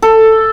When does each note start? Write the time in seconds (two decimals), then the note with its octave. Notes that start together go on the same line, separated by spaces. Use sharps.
0.02 A4